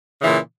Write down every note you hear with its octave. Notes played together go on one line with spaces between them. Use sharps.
A#2 C#3 E3